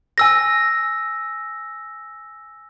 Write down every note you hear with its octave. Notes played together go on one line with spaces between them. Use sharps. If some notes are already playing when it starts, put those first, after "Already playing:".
G#5 E6 A#6